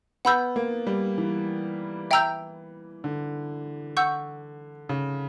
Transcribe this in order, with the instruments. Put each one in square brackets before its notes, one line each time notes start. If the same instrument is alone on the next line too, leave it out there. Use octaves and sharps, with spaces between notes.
[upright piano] B3 [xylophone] F#5 B5 E6 G6
[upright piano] A#3
G3
E3
[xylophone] E5 G5 A#5 E6 G6
[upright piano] D3
[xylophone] F#5 C#6 E6 G6
[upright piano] C#3